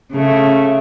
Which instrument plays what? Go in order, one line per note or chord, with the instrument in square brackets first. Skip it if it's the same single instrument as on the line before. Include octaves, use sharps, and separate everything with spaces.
[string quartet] C#3 A3